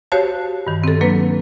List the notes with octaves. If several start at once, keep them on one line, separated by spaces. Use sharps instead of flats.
F#4 G4 C5 C#5 F5 A5
G2 D#3
C4 A4
F#3 A#3 D4 B4